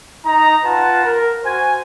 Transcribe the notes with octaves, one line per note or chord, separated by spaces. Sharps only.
D#4 A#5
F4 B4 F#5 A5 A#5
A#4
F#4 C5 G#5